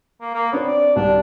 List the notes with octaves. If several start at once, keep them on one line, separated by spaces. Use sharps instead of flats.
A#3
A#3
B3 C4 D4 C#5
D5
C2 G3 D4